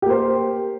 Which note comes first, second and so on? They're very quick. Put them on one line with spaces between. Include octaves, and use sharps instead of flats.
G4 A#3 C5